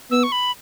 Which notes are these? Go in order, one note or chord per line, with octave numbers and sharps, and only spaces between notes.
B3 E6
C#6
B5